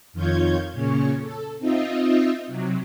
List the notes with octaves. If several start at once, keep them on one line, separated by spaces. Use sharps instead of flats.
F2 D#3 F4 C#5 G6 G#6
A#2 C#3 C#4 C#5
A4
C4 D#4 F4 D#5 E5
C3 F#3